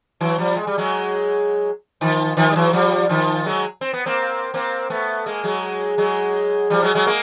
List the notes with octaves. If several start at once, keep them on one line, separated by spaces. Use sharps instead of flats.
E3 F#3
F3 G3
G#3
G3
F#3 G#3
D#3 F3
D#3 F3
G3
E3 F#3
F3 G3
D#3 F3
F#3 G#3
C4
B3
A#3 C4
A#3 C4
A3 B3
G#3 A#3
F#3 G#3
F#3 G#3
F3 G3
F#3 G#3
F#3 G#3
G#3 A#3